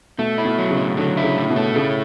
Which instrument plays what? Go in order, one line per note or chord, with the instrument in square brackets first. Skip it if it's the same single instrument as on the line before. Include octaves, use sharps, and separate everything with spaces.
[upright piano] B2 [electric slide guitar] A3
[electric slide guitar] E4
[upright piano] B2
[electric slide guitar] F#3
[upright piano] C#3
[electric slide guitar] A2
[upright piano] D3 [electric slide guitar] F#3
[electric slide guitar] E4
[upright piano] C#3
[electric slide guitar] A2
[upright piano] B2
[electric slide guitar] A3
[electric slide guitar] A2 [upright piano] C#3